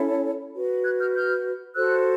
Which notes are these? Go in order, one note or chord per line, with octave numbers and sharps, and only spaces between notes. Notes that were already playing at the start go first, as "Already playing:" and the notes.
Already playing: C#4 E4 A4 C#5
F#4 B4
F#6 G#6
F6 G6
F6 G6
F#4 A4 C5 E6 F#6